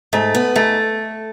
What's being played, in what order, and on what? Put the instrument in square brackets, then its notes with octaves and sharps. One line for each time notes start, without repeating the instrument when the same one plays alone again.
[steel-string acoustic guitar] G#2 [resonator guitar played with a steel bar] A3
[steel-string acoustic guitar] B3
[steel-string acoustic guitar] G#2 [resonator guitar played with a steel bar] A3